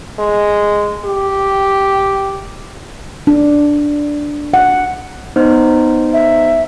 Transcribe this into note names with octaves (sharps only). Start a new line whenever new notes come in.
G#3
G4
D4
F#5
B3 D#4 C5
E5